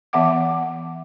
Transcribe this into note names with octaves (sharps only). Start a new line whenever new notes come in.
E3 B3 E5 F#5 D6